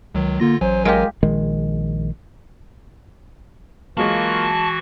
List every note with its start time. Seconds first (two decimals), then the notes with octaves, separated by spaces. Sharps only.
0.15 C#2 D#3 F#3
0.40 D3 A#3 F4 A#6
0.61 A1 F#3 C5 G#5
0.85 G#3 F4 G4 A#4
1.23 A#1 D#3 G#3
3.98 E3 F#3 G#3 A#3 F4 F#4 A5 C#6